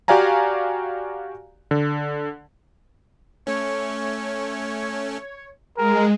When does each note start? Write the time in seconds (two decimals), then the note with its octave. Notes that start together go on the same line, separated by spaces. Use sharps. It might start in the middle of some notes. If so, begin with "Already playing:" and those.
0.08 F#4 G4 D5 F5 G#5 A#5
1.71 D3
3.47 A3 C#4 C#5
5.78 G#3 C4 F4 G#4 A#4